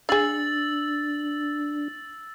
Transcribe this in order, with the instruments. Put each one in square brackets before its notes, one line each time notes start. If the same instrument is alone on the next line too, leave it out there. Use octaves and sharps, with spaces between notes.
[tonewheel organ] D4 [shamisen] G#4 F5 [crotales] E6 A6 F#7